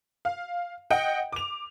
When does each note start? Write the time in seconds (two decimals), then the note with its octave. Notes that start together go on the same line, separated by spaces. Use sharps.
0.25 F5
0.90 D#5 F#5 G5
1.32 D6 F7